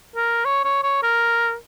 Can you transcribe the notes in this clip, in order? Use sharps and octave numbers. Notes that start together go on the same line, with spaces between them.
A#4
C#5
C#5
C#5
A#4